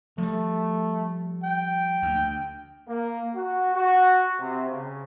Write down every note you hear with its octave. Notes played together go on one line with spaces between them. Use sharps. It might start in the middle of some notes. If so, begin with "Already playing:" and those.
F3 G3 A3
G5
D2
A#3
F#4
F#4
C3
C#3